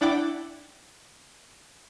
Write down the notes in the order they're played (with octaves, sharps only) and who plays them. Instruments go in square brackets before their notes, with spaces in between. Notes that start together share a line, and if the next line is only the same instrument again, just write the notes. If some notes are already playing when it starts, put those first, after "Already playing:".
[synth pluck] D4 E4 D5 F#5 G5 D6